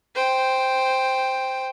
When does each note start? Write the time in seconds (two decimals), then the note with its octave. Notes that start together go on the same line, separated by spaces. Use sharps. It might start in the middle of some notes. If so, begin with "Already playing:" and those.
0.15 C5 G5